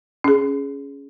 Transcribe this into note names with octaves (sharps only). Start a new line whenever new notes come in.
C#4 G#4